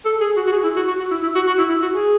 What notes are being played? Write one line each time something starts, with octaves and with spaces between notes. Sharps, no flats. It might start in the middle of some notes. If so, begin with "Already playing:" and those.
A4
G#4
F#4
F#4
G#4
E4
F#4
F#4
F#4
E4
E4
F#4
F#4
E4
E4
F#4
G#4